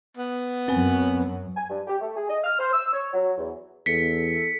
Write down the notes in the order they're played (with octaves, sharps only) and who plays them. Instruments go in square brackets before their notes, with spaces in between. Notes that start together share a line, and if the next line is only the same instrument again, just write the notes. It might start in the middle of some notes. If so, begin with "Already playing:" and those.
[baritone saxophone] B3
[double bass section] F#2 F#3 [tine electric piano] C4 B4 G#5
[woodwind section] G#5
G2
G4
A3
G#4
D#5
F6
C5
E6
C#5
F#3
E2
[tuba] E2 [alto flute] A4 [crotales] B6 C#7